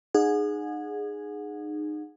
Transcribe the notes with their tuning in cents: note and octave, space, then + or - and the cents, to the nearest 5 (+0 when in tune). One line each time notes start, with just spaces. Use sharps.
D#4 -30 G#4 +0 F#5 -30